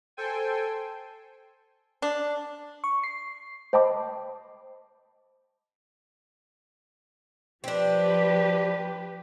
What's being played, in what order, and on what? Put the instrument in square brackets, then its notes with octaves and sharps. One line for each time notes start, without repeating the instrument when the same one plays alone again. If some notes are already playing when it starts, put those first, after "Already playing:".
[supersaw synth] A4 C5 G5 G#5
[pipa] D4
[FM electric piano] C#6
C7
[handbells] C5 D#5 G5 A5 B5 D6
[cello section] F3 G4 B4 [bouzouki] C4 D4